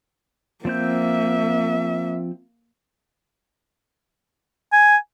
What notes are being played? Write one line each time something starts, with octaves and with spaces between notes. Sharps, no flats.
F3 A#3 C4 E5 G6
G#5